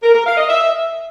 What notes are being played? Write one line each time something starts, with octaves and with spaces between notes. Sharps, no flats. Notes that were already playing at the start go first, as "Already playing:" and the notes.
A#4
A#4
F5
D#5
E5